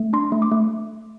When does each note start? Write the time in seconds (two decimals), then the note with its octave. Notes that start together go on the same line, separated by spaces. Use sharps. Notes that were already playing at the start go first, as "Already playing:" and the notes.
Already playing: A3
0.13 D4 C6
0.32 A3
0.42 D6
0.52 A3